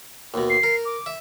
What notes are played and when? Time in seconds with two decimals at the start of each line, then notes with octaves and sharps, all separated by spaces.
0.34 D#2 B2
0.49 C7
0.63 A#4
0.85 D6
1.06 E5